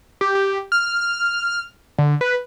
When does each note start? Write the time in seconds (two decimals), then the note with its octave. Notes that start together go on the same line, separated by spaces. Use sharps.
0.21 G4
0.35 G4
0.72 F6
1.98 D3
2.21 B4